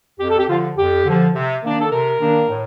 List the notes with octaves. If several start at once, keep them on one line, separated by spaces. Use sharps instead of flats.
F2 G4
A4
G4
D3 F3 F4
F2 G4
D3 F3
C3
D#3 A#3 D4
A4
C3 A#4
D#3 A#3 D4
A2